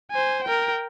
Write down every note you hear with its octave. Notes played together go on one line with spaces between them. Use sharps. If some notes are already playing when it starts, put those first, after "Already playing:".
C5 G#5
A#4 G5